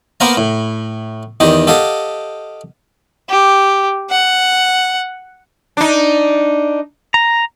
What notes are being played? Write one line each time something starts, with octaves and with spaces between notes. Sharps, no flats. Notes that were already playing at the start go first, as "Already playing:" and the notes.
A#3 B3 A#4 C5 F5 A#5
A2
E2 D#3 G4 D#5
G4 A4 D#5 F5 F#5
G4
F#5
D4 D#4
A#5